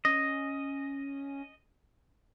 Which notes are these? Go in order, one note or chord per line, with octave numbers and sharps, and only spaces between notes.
C#4 D#5